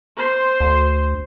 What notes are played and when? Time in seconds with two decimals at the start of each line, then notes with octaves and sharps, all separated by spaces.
0.17 C5 C6
0.60 D2